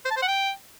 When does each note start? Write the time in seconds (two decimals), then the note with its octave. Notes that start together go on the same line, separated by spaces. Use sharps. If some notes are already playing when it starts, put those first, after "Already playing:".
0.05 C5
0.11 A5
0.17 C5
0.22 F#5
0.28 G5